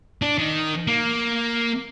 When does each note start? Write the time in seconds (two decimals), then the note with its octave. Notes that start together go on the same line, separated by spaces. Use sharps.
0.22 D4
0.38 D#3
0.87 A#3